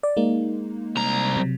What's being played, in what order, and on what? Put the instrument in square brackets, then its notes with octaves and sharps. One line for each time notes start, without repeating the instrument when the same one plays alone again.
[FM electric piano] D5
G#3 A#3 D#4
[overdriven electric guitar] C2 A#5
[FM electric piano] C3 F#3